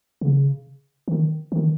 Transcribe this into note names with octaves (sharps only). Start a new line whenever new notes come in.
C#3
D#3
D#3